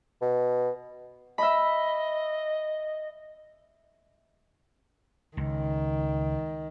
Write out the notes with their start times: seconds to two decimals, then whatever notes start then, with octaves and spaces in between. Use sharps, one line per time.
0.22 B2
1.38 D#5 E5 B5
5.37 C#2 D#3